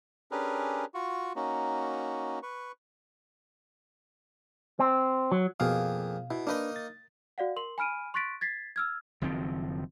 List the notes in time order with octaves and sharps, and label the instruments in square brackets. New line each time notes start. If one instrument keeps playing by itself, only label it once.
[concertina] C#4 D4 G4 G#4 A#4 B4
F4 F#4 C#6
A#3 C#4 D#4 F#4
B4 C#6
[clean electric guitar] C4
F#3
[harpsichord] F2 A#3 G#4 [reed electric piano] B2 F5
[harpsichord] B2 [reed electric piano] E4
[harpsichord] A#3 D#4 D#5 [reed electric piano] D4 B4
[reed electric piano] A6
[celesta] F#4 D5 F5 F#5
A#4 C6 F#7
G#5 B5 F6 D7 D#7
C6 C#6 F#6 A6 B6 D7
G#6 A6 B6 C7
E6 F6 G#6
[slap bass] F#1 D#3 F3 C4